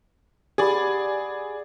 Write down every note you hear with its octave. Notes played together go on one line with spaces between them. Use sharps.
G4 G#4 D5 F#5 B5